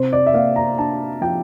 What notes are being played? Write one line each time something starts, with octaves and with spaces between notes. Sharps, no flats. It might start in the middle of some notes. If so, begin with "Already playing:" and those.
Already playing: C3 C5
D5
E5
A#3 F5
A#5
D4 A5
F3 G5